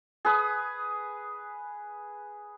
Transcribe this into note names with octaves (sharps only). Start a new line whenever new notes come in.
G#4 B4 D#6